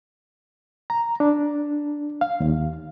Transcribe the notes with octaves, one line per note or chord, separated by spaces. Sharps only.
A#5
D4
F5
D#2